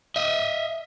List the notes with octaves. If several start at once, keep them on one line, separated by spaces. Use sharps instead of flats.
D#5 E5